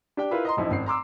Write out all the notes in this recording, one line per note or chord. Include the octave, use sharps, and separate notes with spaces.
D4 G4 D5 G5
E4 F4 A#4 B4
D#5 A#5 C6
D1 A1 F3 D#4 E4
G#1 C4 C7
A#5 C6 D6 E6